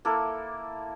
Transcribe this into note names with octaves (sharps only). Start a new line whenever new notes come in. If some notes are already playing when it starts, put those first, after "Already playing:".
A#3 E4 A4